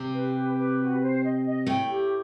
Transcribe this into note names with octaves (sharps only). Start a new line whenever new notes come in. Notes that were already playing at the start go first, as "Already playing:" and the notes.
Already playing: C3 C4 G4
B4
G4
B4
F#4
C5
D#5
D#5
A2 A3 G5
G4